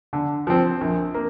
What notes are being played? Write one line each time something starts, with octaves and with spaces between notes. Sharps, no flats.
D3
F3 C4
A#1
A#3